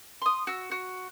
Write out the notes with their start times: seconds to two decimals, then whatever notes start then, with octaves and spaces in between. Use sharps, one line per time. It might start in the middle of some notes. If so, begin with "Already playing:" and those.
0.22 C6 D#6
0.47 F#4 E6
0.71 F#4